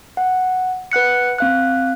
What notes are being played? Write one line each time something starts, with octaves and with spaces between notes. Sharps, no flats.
F#5
B4 F#5 F#6 C#7
C4 F5 F#6